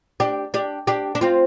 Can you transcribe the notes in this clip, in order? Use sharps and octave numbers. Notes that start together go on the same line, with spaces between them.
D4 G4
D4 G4
D4 G4
D4
C4 F4